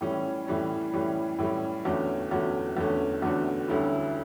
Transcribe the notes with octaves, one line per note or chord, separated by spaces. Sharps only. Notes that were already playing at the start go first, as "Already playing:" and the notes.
A2 E3 G3 C#4
A2 E3 G3 C#4
A2 E3 G3 C#4
A2 E3 G3 C#4
E2 D3 A3 C#4 F#4
E2 D3 A3 C#4 F#4
E2 D3 A3 C#4 F#4
E2 D3 A3 C#4 F#4
D2 D3 G3 C#4 E4